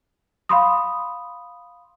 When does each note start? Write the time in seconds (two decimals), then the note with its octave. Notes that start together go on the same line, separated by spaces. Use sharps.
0.49 F5 B5 C6 D#6